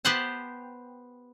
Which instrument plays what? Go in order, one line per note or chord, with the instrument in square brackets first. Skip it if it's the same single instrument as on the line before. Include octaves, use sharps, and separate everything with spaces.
[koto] B3 G4 B4 C5 F#5 A5